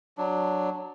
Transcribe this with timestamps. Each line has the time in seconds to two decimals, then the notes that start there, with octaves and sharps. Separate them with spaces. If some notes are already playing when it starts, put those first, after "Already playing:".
0.18 F#3 D4